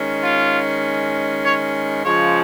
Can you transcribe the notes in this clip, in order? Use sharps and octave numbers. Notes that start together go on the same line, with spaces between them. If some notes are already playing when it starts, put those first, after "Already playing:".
Already playing: D#3 G#3 C#4
F4
C#5
C#3 F3 G#3 C#5